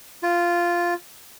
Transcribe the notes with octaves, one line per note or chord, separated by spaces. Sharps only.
F4